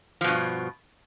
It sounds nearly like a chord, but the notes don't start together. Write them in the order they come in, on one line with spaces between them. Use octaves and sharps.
F3 B2 G2